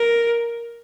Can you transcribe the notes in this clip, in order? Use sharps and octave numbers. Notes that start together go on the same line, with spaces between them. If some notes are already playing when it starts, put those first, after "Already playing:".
Already playing: A#4